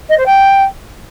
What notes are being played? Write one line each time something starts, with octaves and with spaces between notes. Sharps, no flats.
D#5
C5
G5